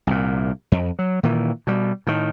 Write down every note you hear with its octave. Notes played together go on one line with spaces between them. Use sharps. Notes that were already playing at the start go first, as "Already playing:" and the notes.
C2 A#2
F2
F#3
A#2 D#3 E3
B2 G3
A2 D#3